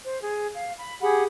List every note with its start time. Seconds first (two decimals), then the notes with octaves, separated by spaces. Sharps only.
0.04 C5
0.21 G#4
0.54 F5
0.77 B5
1.01 G4 G#4 F#5 B5